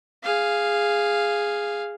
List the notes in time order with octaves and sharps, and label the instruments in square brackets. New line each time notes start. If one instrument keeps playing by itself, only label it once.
[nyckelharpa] G#4 F5